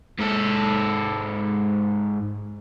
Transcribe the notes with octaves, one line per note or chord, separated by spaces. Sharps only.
G#2 A4